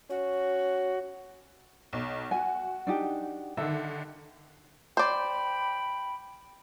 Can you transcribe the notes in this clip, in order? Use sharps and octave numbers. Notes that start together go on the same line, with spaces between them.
C#4 F#4
B1
F#4 G#5
D4 D#4 G4
D3 D#3 E5
C5 D5 G5 B5